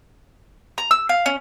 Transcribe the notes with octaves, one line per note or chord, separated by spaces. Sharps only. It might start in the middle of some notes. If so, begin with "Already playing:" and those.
A#5
E6
F5
C#4